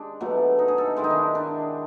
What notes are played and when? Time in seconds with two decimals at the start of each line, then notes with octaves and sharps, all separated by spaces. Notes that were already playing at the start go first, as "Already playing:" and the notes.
Already playing: G#3 D4 G4
0.21 B2 F#3 A3
0.59 D#4
0.68 G#4
0.78 A4
0.97 D#3 G#3 E4
1.04 D#4
1.10 D4
1.35 D4